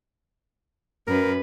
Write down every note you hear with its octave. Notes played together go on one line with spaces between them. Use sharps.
F#2 A#4 B4